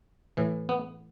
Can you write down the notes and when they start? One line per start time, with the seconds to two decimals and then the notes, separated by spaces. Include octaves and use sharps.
0.37 A2 E3
0.69 B3